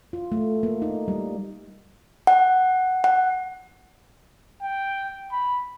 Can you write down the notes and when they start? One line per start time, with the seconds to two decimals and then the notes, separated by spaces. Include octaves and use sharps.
0.13 F4
0.32 A3
0.63 A#3
0.82 D#4
1.08 G3
2.27 F#5
3.04 F#5
4.62 G5
5.32 B5